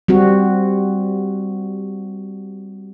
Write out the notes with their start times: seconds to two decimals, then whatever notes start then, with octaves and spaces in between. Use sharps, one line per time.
0.08 G3 C4 F#4